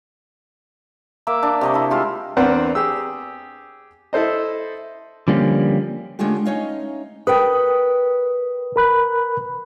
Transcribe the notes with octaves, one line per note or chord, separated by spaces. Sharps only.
A#3 E5 D6
D4
C3 D#5 C#6
E4 A4
G#3 F4 G4
E2 C4 D4 A#4 B4 F#5
G4 G#4 E6
E4 A4 C5 D#5
D3 F3 G3 A#3 C#4
D3 G#3 A3 C#4 F4 G4
A3 C#4 D#4 C#5 D#5 F5
A#4 B4 G5 D#6
A#4 B5 F#6